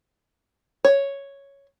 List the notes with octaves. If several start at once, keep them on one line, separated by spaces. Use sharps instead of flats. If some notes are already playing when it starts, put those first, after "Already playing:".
C#5